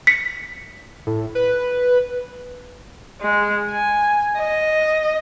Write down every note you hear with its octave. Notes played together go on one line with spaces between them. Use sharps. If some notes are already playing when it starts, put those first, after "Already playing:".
B6 C#7
A2
B4
G#3
G#5
D#5